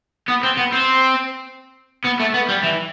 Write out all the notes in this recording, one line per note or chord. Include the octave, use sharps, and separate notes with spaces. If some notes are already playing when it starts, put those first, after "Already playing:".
B3
C4
B3
C4
B3
A3
B3
G3
E3